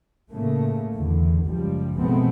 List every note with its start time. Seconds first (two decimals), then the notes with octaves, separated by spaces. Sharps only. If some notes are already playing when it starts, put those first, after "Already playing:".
0.32 A2 C#3 A3 A#3
0.94 E2 D3
1.47 F#1 C#2 F3 G3
1.99 B2 F3 G#3 A3 B3 C4